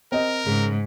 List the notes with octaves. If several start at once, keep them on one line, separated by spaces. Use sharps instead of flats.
C4 A#4 D#5
G#2 C#3